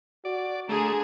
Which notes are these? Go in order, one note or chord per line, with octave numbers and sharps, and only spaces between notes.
F#4 D5
D3 A3 G#4 A#5